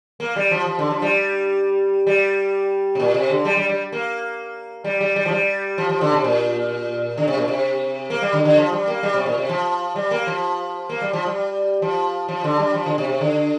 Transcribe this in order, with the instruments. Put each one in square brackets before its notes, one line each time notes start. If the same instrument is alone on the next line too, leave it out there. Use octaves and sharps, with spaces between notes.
[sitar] A#3
G3
F3
F3
D3
F3
G3
G3
C3
A#2
C3
D3
G3
G3
G3
A#3
G3
G3
G3
F3
G3
F3
F3
D3
C3
A#2
D3
C3
A#2
C3
A#3
G3
D3
D3
F3
G3
A#3
G3
C3
A#2
C3
F3
G3
A#3
F3
A#3
G3
F3
G3
F3
F3
D3
G3
F3
D3
C3
C3
D3